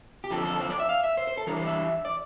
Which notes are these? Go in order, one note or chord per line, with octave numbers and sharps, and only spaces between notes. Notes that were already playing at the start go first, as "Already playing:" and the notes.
G4
D3 F3 C4 A4
A4
C5
D5
E5
F5
E5
C5
C5
A4
E3 G3 D4 A#4
C5
E5
D5